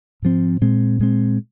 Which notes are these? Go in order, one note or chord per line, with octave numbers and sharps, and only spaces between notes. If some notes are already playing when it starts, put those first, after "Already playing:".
G#2 F3 C4
A#2 G#3 C4
A#2 G#3 C4